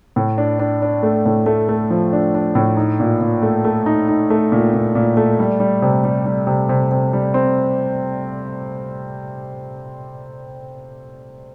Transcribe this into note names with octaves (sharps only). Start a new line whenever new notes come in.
A2
D4
D4
D4
A3
A2
A3
A3
F3
D4
D4
A2
D#4
A#2
A#2
A3
A3
D#4
D#4
A3
A#2
A#2
A#2
A3
G3
G3
C3
G3
G3
C3
C3
C3
G3
C4